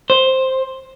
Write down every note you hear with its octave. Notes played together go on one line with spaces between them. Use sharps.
C5